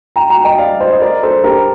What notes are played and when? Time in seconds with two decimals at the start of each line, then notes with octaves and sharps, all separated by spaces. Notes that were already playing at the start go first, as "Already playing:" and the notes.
0.16 G5 A#5
0.30 G5 A#5
0.44 D#5 G5
0.58 D5 F5
0.80 C5 D#5
0.92 D#5
1.01 A#4 D5
1.23 A4 C5
1.44 G4 A#4